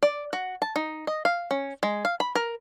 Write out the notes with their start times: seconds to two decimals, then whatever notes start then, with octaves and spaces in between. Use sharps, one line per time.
0.03 D5
0.33 F#4
0.62 A5
0.76 D#4
1.07 D#5
1.25 F5
1.51 C#4
1.83 G#3
2.05 F5
2.20 B5
2.35 A#4